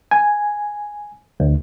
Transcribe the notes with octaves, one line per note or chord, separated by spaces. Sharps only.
G#5
D2